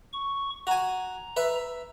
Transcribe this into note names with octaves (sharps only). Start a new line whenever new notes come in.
C#6
F#4 G#5 A#5
B4 E5